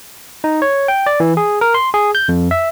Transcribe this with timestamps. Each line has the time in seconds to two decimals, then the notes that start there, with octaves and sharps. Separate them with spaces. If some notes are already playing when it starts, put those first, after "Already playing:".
0.44 D#4
0.62 C#5
0.88 G5
1.06 D5
1.20 E3
1.37 G#4
1.61 A#4
1.74 C6
1.94 G#4
2.15 G6
2.28 F2
2.51 E5